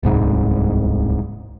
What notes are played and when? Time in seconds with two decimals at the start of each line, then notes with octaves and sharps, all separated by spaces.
0.03 D1 C2 G#2